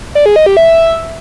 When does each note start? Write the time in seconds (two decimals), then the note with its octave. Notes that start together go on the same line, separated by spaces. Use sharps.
0.15 D5
0.26 G#4
0.36 D#5
0.46 G4
0.57 E5